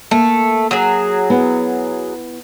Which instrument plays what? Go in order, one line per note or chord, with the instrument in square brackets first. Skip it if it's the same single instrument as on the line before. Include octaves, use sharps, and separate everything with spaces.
[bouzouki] A3 [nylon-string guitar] A#3
[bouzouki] F#3 G#4
[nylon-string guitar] B3 E4